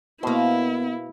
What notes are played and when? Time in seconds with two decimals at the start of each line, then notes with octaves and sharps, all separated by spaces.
0.23 B2 A#3 B3 E4 C5